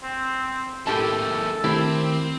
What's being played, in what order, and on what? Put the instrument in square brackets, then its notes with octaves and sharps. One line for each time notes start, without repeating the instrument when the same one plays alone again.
[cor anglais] C4
[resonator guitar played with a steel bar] A2 G4 A5 [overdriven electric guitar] G#3 A#3 [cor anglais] A4
[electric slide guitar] D#3 A3 A#4 [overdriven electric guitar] C4 [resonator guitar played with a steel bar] E4 G4